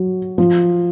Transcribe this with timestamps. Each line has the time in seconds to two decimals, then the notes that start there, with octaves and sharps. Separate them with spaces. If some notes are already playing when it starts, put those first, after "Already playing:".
Already playing: F#3
0.38 F3